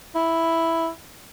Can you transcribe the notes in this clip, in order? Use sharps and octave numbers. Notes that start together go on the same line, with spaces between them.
E4